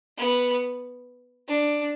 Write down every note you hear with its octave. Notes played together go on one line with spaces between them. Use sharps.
B3
D4